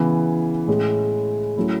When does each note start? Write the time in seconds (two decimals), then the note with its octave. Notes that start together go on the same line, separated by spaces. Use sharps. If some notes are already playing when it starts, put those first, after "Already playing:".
Already playing: C#3 E3 B3
0.67 A2 G#3 C#4
1.57 F#3 A3 C#4 E4